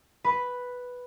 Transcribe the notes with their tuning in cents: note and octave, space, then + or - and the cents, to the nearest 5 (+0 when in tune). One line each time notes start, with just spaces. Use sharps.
B4 +0